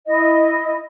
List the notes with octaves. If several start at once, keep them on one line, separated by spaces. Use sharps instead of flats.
E4 D#5